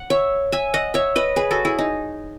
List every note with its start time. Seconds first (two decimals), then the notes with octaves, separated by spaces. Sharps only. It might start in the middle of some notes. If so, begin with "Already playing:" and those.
Already playing: F#5
0.10 C#5 E5
0.52 E5 G#5
0.74 D#5 F#5
0.94 C#5 E5
1.16 B4 D#5
1.36 G#4 B4
1.51 F#4 A4
1.65 E4 G#4
1.79 D#4